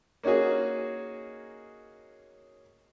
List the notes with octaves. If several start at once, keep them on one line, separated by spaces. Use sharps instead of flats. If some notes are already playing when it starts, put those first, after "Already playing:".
A#3 C#4 D#4 F#4 G#4